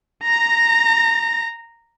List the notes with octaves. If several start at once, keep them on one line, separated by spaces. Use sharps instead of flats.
A#5 A#6